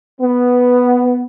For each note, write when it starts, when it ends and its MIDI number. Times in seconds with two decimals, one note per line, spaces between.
0.21 1.23 59